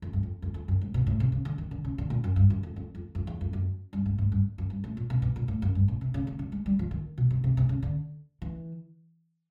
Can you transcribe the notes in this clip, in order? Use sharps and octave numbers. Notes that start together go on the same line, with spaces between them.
F2
F#2
F2
F2
F2
F#2
G#2
B2
A2
C3
C#3
D3
D#3
D3
C#3
D3
A#2
F#2
G2
F#2
F2
F2
F2
F2
E2
F2
F#2
G2
G#2
G#2
G2
F#2
G2
A2
A#2
B2
B2
A#2
A2
F#2
G2
A#2
C3
C#3
C#3
D3
G#3
G3
F3
D#3
B2
C3
C3
C3
C#3
D3
E3